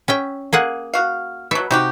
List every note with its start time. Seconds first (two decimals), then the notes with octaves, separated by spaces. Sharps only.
0.08 C#4 E5 G5
0.53 A#3 G#4 F#5
0.94 F#4 F5
1.51 B2 F#3 E5
1.71 C3 D#4 F#4 G4